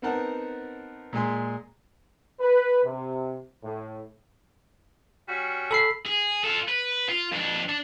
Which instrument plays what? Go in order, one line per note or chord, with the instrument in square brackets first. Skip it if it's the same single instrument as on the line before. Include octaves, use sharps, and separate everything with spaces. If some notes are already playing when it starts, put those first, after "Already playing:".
[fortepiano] B3 C4 D#4 A#4 F#5 A5
A#2 G#3 G#5 C6
[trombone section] B4
C3
A2
[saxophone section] G3 C#4 F#4
[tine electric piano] A4 B5 C7
[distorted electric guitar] G#4
F4 A4
B4
F4
F2 D4
D4